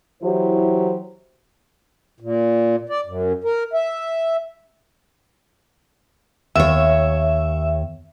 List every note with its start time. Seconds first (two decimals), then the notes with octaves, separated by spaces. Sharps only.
0.23 E3 F#3 E4 G4 C5
2.20 A#2
2.89 D5
3.06 F#2
3.44 A#4
3.73 E5
6.56 D#2 C#5 E5